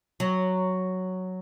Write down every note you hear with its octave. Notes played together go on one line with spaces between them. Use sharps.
F#3